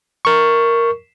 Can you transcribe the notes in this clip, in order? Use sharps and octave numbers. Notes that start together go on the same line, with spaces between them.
A#4 C#6